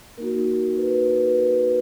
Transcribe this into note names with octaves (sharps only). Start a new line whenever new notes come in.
A#3 D#4 F#4 A#4
B4
B4
A#4